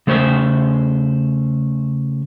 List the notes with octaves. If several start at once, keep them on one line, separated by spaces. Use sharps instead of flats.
C#3 A3 G#4 C5 E5 G5